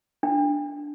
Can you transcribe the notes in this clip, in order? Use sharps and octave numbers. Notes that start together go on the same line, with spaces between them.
D4